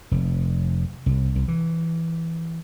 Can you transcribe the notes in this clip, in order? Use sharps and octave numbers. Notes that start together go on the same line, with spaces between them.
F1
C2
C2
E3